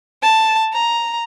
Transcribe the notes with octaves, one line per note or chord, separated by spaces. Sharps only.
A5
A#5